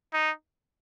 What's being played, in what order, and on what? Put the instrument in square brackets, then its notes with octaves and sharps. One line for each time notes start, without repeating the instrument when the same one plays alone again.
[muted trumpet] D#4